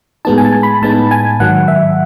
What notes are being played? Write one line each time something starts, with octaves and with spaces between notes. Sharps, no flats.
A2 G#3 B3 D#4 A5
G#5
A5
B5
A2 G#3 B3 D#4 A5
G#5
G#2 D#3 F#3 F#5
E5